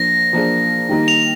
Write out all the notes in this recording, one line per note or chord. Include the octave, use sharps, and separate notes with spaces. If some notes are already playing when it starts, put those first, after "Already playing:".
Already playing: F3 A#3 D4 A#6
F3 A#3 D4 G#4
D#3 G3 A#3 D#4
F7